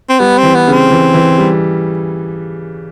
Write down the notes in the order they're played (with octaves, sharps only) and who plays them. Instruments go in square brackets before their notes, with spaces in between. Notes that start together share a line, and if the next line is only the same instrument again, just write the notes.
[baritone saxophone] C4
[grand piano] G3 [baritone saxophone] B3
[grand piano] E3 [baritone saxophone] C4
[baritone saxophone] B3
[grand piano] C#3
[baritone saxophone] C4
[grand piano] E3
E3
G3